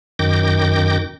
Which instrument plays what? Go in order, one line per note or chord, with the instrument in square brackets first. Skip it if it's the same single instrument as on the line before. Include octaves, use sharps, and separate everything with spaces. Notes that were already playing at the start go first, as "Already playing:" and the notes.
[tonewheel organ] F#2 D#3 G5 D6 G6 A#6